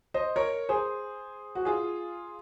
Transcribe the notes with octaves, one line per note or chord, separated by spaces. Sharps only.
C5 D#5
A#4 C#5
G#4 C5
F#4
F4 G#4